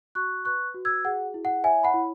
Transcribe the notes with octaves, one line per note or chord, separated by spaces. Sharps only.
F#4 C#6 F#6
B4 C#6 F#6
F#4
E6 G#6
G#4 F#5
E4
F#5
C#5 E5 G#5
F#5 B5
E4